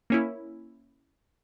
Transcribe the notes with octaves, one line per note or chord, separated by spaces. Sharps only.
A#3 C#4 E4